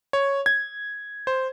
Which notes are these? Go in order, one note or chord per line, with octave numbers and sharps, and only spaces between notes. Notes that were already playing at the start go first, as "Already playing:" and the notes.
C#5
G#6
C5